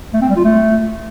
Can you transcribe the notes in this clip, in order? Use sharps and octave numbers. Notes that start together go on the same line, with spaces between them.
A3
C4
G3
F4
A3